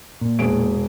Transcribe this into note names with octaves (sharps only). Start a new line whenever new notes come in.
A#2
E1 G#4 D7